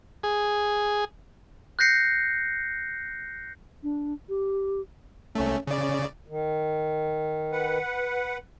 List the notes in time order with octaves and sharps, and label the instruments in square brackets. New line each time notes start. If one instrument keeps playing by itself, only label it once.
[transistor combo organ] G#4
[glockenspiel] F#6 G6 A#6 C7 C#7
[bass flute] D4
G4
[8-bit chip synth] C2 A3 [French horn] C#4
[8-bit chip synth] C#3 D5 [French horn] C#4
[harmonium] D#3
[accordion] B4 F#5